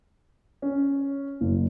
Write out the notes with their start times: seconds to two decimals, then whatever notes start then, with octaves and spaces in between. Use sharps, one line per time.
0.62 C#4
1.41 F#1